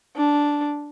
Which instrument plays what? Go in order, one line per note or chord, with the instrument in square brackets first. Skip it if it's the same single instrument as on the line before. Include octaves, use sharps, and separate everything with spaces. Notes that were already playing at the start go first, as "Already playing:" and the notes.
[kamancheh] D4